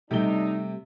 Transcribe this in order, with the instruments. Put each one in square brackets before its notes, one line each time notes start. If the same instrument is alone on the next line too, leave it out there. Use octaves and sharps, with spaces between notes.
[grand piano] C3 C4 G7 [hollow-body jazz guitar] G3 A3 [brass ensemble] D4 D#4